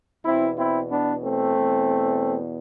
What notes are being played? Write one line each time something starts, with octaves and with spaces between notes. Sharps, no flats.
E2 B2 C4 E4
C4 E4
B3 D4
A3 C4
E2 B2